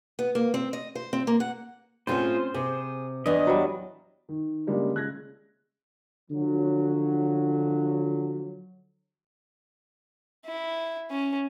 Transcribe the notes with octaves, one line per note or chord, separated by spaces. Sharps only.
B3
A#3
C4
D#5
C5
C4
A#3
F#5
A2 C4 C#4 F4 G#4 C5 C#5
C3 G#4
E2 E3 D4 D#5
F#3 G3
D#3
C#3 G3 G#3 A#3 D4
C#3 G#3 F#6 G#6 A#6
D3 F3 F#3
E4
C#4